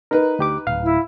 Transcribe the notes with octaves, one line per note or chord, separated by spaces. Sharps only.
D#4 A#4 B4
D2 G4 D6
D1 F5
E4